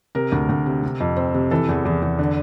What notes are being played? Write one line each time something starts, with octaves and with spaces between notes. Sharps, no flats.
C3 A#4
D2
D2
C3
C3
F2
C4
C3
E3 A4
E2
E2
E2
D3